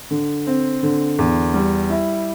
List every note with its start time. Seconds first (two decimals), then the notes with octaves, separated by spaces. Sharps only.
0.11 D3
0.47 C4
0.83 D3
1.19 E2
1.54 G3
1.90 E4